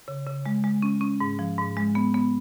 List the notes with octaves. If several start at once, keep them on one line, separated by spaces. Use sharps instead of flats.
C#3
C#3
G#3
G#3
C#4
C#4
G#2
F3
G#2
G#3
B3
B3